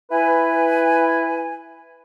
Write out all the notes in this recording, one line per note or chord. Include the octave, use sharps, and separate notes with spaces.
E4 B4 G#5